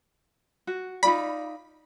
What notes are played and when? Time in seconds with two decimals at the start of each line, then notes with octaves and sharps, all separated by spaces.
0.67 F#4
1.03 D#4 F4 D5 B5